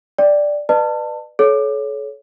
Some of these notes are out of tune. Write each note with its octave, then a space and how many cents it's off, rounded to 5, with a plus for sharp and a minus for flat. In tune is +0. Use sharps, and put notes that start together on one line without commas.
D5 +0 G5 +0
B4 +0 D5 +40 A5 +25
A4 -40 C#5 +10